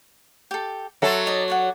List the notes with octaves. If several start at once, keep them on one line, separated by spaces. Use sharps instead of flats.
G4 A4
F#3 A4 E5 C6
D#4 D5 D#5
C#5 D5 F#5